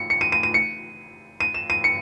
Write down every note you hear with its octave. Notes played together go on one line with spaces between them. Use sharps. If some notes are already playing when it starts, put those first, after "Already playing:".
Already playing: C#7
C#7
D#7
D#7
D#7
C#7
D#7
E7
D#7
C#7